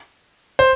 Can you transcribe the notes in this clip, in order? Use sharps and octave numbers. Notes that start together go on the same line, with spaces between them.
C5